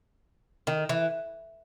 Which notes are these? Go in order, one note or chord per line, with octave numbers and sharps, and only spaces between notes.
D#3
E3